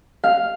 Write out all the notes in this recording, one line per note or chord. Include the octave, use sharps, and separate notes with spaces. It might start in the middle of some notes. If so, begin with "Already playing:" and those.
F5